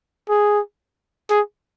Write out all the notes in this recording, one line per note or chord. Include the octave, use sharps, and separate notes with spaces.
G#4
G#4